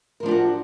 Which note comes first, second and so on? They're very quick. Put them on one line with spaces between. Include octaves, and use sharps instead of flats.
A#4 F3 D4 G4 F#4